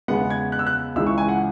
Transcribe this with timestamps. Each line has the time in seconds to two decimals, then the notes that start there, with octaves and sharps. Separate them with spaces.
0.08 E2 C#3 G#3 B3 F#5
0.30 G#6
0.52 F#6
0.59 E6
0.67 F#6
0.96 C#2 C#3 E3 G#3 E6
1.07 C#6
1.18 G#5
1.28 F#5